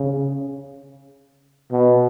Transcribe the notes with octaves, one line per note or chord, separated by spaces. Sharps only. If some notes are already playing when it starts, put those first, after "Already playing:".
Already playing: C#3
B2